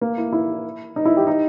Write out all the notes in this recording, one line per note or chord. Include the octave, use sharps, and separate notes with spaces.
A#3
E4
E4
D#4
E4
G4
D#4